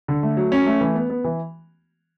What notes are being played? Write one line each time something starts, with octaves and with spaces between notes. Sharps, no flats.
D3
A3
F#3
C#4
A3
E3
B3
B3
E3